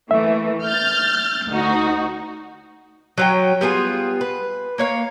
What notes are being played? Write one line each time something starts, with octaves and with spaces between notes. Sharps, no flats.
E3 A3 A#3 E5
F6 G6 A6
D2 D#4 F#4
F#3 C#4 G5
G3 B3 F4 G#4
B4
A#3 C#5 F5